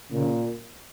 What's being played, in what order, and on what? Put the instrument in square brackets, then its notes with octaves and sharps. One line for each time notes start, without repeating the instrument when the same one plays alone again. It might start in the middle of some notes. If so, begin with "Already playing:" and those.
[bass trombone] A#2 [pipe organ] C#3